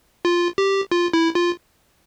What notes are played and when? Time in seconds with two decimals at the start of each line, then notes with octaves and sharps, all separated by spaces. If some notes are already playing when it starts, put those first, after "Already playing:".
0.25 F4
0.58 G4
0.92 F4
1.13 E4
1.35 F4